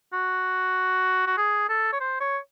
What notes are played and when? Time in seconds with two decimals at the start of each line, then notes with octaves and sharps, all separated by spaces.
0.13 F#4
1.27 F#4
1.38 G#4
1.69 A4
1.93 C#5
2.00 C5
2.21 C#5